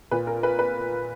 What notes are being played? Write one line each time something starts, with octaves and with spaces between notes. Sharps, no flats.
A#2 B4
A#4
B4
B4